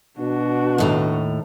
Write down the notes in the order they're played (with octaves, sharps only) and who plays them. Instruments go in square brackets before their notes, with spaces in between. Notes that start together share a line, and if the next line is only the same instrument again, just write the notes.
[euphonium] B2 [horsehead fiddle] D4 F#4
[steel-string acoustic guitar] D#2 A2 A#5